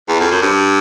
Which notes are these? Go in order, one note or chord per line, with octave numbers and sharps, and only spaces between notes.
E2
F2
F#2
G2